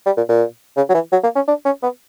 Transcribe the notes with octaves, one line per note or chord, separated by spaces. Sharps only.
G3
A#2
A#2
C#3
F#3
E3
F#3
A#3
C#4
D4
C#4
B3